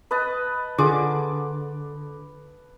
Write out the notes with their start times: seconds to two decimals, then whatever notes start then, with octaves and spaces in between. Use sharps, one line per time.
0.11 B4 D#5 A5
0.78 D3 F4 G#4 D6